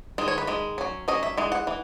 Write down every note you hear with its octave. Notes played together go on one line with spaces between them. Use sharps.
D#3 G#3
C#5
B4
D#3 G#3
F#3 C#4
F#3 C#4 D#5
E5
E3 G#3
F#5
E3